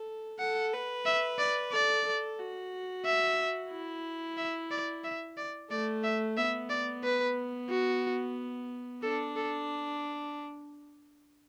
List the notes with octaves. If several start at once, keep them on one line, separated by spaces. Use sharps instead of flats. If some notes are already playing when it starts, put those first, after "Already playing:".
Already playing: A4
A4 F#5
B4
E5
D5
A4 D5
A4
F#4
E5
E4
E5
D5
E5
D5
A3 D5
E5
B3 E5
D5
B4
F#4
D4 A4
A4